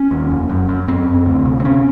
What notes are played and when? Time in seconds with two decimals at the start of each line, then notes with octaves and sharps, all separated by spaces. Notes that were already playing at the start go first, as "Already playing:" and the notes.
Already playing: C#4
0.11 D#2
0.31 F1
0.49 F#2
0.69 F#2
0.88 F#2 C4
1.07 F#2
1.26 D2
1.45 C3
1.60 C4
1.65 C3 C#4